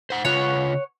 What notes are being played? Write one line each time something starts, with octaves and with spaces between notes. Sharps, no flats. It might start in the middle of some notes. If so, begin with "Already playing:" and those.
C5 F#5
C#3 F4 B4 C#5 F#5